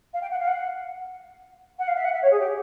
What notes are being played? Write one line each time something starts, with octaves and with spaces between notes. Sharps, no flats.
F5
G5
F#5
F5
F#5
F#5
F5
E5
F#5
E5
C#5
G#4
G4